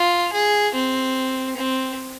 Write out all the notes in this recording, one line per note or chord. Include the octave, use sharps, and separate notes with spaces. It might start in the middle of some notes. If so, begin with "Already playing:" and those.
Already playing: F4
G#4
C4
C4